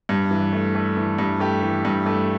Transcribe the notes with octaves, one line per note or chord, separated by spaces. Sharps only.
G2
E3
A3
A3
E3
G2
A3 G4
E3
G2
A3